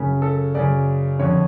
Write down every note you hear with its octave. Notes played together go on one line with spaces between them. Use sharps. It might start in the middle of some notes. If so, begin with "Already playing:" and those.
Already playing: F#2 C#3
A4
F#2 C#3 D5
F2 D3 C#5